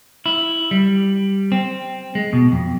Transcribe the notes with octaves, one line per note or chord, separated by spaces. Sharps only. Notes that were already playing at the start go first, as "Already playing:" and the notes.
E4
G3
C4
G#3
B2
F2